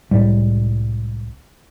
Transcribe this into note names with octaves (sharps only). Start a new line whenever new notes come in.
C2 A2 G3 G#3